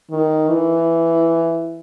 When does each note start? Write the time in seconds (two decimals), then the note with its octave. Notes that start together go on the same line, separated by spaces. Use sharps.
0.11 D#3
0.49 E3